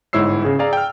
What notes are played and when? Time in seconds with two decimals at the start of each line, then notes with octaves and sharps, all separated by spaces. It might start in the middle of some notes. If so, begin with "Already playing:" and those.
0.13 G1 G#2 E4 C#5 E6 C7
0.45 C#3 G#4
0.59 G#4 D5 F5 A#5
0.73 G5 F6